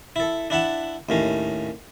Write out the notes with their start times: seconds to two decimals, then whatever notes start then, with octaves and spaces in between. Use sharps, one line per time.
0.16 E4 A4
0.50 D4 E4 F#5 A5
1.09 D#2 A2 C#4